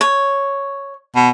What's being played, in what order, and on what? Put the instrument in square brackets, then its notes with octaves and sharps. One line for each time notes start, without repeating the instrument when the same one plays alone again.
[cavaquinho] C#5
[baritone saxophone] B2